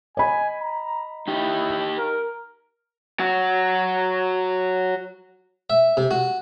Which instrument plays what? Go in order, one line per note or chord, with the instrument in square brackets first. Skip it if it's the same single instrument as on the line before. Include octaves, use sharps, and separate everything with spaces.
[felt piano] D#5 B5 [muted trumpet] G#5
[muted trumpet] A#5
[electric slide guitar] D#4 G4 [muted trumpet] E4
[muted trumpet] A#4
[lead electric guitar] F#3 F#4
[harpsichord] E5
C3
F#4